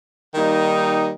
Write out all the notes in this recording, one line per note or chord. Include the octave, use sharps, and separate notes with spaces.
D#3 G3 A#3 D#4